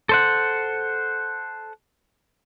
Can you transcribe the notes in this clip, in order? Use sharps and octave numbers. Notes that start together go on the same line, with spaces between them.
A4 C5 F#5